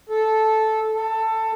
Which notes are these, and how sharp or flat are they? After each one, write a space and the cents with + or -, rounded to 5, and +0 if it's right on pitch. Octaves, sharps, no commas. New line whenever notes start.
A4 -10
A4 +15